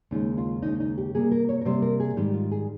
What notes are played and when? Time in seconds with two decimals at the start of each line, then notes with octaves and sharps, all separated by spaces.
0.11 D#2 C#3 G#3 D#4
0.38 F4
0.62 D#2 C#3 G#3 D#4
0.80 D#4
0.98 G4
1.14 C3 G3 A#3 G#4
1.31 A#4
1.49 C#5
1.61 A#4
1.65 C3 G3 A#3 C5
1.82 A#4
2.00 G#4
2.16 G#2 D#3 G3 G4
2.34 F4
2.51 G#4